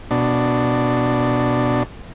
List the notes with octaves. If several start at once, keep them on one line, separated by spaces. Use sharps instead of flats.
B2 D4